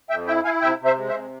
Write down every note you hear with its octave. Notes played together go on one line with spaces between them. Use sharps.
F2 E5 G5
E4 E5 G5
E4 F5 G#5
C3 E5 G5
C3
C5 E5
G#3
C5 E5
C3